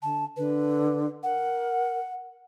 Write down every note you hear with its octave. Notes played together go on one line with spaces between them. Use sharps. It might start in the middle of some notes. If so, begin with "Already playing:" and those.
D3 A5
D3 B4
A#4 F#5